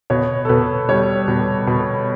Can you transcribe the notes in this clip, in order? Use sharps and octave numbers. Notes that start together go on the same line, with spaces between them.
B2 C#5
A4
B2 B4
G3 C#5
B2
B2